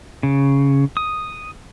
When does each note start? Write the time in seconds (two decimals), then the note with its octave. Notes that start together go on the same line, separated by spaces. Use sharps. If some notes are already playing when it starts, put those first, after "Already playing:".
0.23 C#3
0.97 D#6